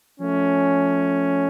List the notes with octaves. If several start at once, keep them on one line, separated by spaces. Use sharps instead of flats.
F3 A3 C#4